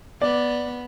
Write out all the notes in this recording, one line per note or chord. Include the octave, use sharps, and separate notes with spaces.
B3 D5